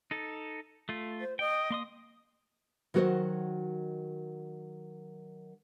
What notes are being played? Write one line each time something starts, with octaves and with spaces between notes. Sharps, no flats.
D#4 A4
A3 F4
C5
D#5 G5
A#3 C6 D#6
D#3 F#3 F#4 A#4 C5 D#5